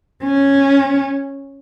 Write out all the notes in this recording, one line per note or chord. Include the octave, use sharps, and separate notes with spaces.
C#4